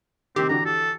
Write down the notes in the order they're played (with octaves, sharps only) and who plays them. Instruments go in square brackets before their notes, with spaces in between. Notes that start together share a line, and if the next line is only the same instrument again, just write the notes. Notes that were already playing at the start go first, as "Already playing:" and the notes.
[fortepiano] C3 D#3 [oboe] C4 [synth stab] G4
[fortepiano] D3 E3 F#4 [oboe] A#5
[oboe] A4